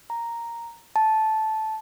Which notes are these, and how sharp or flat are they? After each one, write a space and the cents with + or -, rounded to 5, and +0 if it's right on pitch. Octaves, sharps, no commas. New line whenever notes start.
A#5 +0
A5 -10